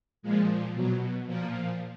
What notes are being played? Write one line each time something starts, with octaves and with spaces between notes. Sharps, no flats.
A#2 F3 G#3
B2 F#3
A#2 F3 A#3